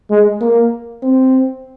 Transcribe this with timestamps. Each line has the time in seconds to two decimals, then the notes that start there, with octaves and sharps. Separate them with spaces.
0.10 G#3
0.41 A#3
1.03 C4